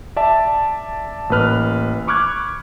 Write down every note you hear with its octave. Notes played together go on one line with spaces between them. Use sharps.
D5 E5 A5
A1 A#3 B4 F6
B5 C#6 D6 F6 F#6 G#6